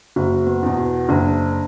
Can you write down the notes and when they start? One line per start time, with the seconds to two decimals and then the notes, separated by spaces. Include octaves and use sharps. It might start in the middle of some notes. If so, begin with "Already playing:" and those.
0.16 F#1 F#4
0.47 B3
0.63 E2 B2
0.78 B3
1.09 F#1 D4